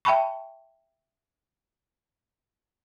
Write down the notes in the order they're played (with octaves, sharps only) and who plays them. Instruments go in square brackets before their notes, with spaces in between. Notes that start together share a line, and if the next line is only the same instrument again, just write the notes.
[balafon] E5 G5 A5 B5 C#6